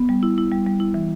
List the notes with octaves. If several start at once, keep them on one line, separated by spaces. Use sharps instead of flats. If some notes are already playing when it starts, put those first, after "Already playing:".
Already playing: B3
G3
E4
E4
G3
G3
E4
E3